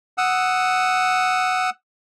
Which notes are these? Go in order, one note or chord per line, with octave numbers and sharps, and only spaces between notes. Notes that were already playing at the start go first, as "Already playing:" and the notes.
F#5 D#6 E6